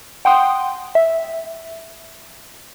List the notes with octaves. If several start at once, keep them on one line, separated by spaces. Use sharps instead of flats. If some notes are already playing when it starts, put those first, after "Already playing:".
F#5 G5 C6 D#6
E5